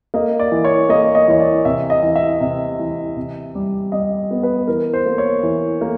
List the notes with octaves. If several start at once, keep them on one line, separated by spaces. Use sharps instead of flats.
A#3 D#5
D5
E3
C#5
A#3 D#5
D#5
E3 C#5
D5
C3 E5
D#5
E3
E5
C3
E3
C3
G3
G3 D#5
B3
B4
E3 A#4
C5
A#3
C#5
E3
A#3